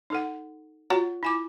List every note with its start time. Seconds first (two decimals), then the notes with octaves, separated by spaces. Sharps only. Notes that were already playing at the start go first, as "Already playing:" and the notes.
0.10 D#4 A4 F#5
0.90 F4 F#4 C#5 A#5
1.23 E4 G#5 D6